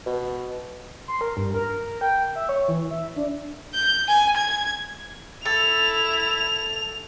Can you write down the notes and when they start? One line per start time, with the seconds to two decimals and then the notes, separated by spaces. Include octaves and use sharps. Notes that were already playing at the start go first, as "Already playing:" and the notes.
0.06 B2
1.08 C6
1.21 A#4
1.37 G2
1.54 A#4
2.01 G5
2.36 E5
2.49 C#5
2.68 E3
2.91 E5
3.16 D4
3.74 G6
4.08 G#5
4.37 G#6
5.45 E4 A4 F7